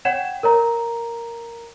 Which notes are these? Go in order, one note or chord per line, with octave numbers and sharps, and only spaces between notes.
C#5 F#5 G5 G#6 E7
A#4 C#5 A#5